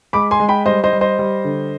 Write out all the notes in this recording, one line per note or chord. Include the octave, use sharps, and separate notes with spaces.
G#3 B5 D6
G#5 C6
G#3
G5 B5
G3 C5 D#5
C5 D#5
G3
C5 D#5
G3
D3